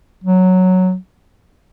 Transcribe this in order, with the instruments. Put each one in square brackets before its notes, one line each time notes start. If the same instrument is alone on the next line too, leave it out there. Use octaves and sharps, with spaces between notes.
[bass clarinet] F#3